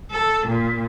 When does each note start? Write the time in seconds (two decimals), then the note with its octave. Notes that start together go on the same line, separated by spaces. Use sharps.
0.11 A4
0.47 A#2